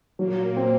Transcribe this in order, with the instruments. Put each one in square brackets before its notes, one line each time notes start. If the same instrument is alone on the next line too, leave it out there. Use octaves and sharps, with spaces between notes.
[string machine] A#2 A#3 [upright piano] F#3
[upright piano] C4